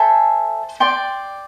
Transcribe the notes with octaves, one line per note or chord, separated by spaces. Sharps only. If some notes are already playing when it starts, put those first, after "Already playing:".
Already playing: A4 C5 E5 G#5
D5 G5 C6